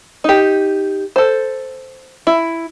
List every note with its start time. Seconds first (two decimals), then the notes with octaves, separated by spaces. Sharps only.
0.24 D#4 G4
1.16 A4 C5
2.27 E4